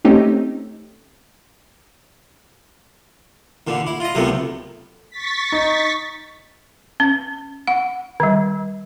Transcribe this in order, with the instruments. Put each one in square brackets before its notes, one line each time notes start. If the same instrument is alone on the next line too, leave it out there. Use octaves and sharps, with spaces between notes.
[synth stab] A3 C4 C#4 D#4 G4
[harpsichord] D#2 A#2 D3
E4
F4 D#5
C#2 F#2 C3 D#3 A3 B3
[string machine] C#6 A6 B6
[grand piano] D#4
[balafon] C#4
F#5
D#3 G3